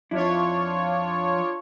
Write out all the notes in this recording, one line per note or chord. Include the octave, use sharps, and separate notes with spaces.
F2 D4 E4 F4 C#5